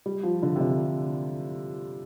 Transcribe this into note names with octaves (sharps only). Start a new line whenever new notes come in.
G3
F3
D3
C3
D3